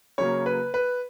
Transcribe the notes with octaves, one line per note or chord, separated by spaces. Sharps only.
C#3 F#3 A#3 C#5
B4
B4